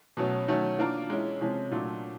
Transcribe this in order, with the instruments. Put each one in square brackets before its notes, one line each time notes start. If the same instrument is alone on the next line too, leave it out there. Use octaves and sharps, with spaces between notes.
[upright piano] B2 F#3 A3 C#4
D#3 F#3 A3 C#4
A#3 D4 F4 A#4
G#3 C#4 E4
C3 F3 G#3 C#4
A#2 F#3 A3 D4